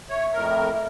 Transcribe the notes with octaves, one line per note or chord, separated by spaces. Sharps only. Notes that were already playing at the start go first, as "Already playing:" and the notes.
C#5 E5
F2 A2 A#4